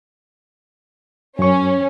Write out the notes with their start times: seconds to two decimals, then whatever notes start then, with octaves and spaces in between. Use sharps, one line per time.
1.39 F#2 C#4 C#6